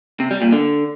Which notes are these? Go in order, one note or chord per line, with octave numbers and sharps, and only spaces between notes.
C3
G3
A#2
D3